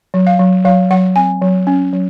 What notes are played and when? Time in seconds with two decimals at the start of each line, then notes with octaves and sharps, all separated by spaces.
0.14 F#3
0.27 F5
0.39 F#3
0.65 F#3 F5
0.90 F#3 F#5
1.16 C4 G#5
1.42 F#3
1.67 C#4
1.93 F#3